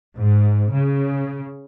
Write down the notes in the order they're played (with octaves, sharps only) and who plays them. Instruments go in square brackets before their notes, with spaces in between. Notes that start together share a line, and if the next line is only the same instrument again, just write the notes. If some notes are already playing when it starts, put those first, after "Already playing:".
[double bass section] G#2
C#3